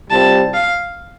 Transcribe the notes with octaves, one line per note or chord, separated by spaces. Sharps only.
C2 C3 G3 C4 F4 A5
F5